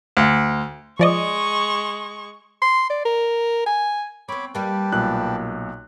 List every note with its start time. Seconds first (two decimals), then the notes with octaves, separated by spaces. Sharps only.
0.17 D2
0.99 F3 G#3 D5 D#5 C#6
2.62 C6
2.90 D5
3.05 A#4
3.66 G#5
4.29 B3 C4 C#5 B5 D6
4.55 G3 A#3 G4 B4 A5
4.92 B1 A#2 F#6